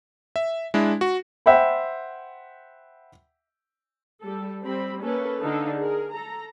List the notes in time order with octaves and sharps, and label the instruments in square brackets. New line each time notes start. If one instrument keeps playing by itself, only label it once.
[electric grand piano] E5
G#3 D4 E4
F#4
[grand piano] C5 E5 F#5 G5 B5
[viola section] G3 A4
G3 C4 B5
A#3 C#4 A4 B4
D3 D4 D#4 A4 F5
G#4 A#4
A4 A#5